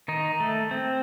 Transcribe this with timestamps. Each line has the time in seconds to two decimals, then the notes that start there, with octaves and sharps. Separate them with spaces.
0.08 D#3 D#4
0.40 A3
0.71 C4